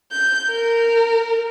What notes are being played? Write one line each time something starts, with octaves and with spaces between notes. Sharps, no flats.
G6
A#4